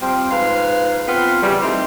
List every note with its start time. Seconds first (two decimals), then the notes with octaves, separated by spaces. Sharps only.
0.02 F3 G3 C4
0.31 G#2 F4 B4 F5
1.07 B3 C4 F4 B4
1.42 C#3 E3 G3
1.62 G3 A3 C4 D#4 E4